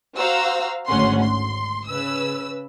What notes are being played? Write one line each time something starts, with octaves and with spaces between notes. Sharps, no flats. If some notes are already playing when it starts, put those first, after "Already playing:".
F#4 C5 F5 F#5 A#5 E6
G#1 D2 G#2 C#4 F#5 C6
C6
C#3 B4 E6